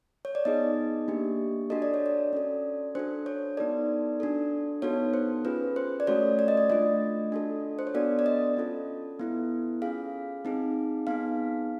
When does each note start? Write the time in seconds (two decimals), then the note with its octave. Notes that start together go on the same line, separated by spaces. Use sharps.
0.25 C#5
0.35 D5
0.45 B3 D#4 G#4 D#5
1.08 A#3 D4 G4
1.70 D4 F#4 A4 D#5
1.82 D5
1.94 C#5
2.06 D5
2.33 C#4 F#4 A4
2.95 D4 F#4 A4 C5
3.26 C#5
3.57 B3 D#4 F#4 A4 D5
4.20 D4 F#4 A4
4.82 B3 D#4 F#4 A4 C#5
5.14 C5
5.45 C#4 F4 G#4 B4
5.76 C5
6.00 D5
6.07 A3 C#4 F#4 A4 C#5
6.39 D5
6.48 D#5
6.57 D5
6.70 A3 D4 F4 D#5
7.32 D4 F#4 A4
7.79 C5
7.87 C#5
7.94 B3 D4 F#4 A4 D5
8.19 D5
8.26 D#5
8.57 C#4 F4 A4
9.20 B3 E4 A4
9.82 C#4 F4 G#4 F5
10.45 C4 D#4 G#4
11.07 B3 D#4 G#4 F5